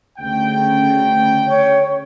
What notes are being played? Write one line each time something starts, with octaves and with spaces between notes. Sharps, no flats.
D2 C#3 G5
C#5